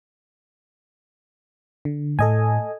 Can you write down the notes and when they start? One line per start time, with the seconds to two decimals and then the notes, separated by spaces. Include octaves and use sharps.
1.85 D3
2.19 A2 A4 D#5 G#5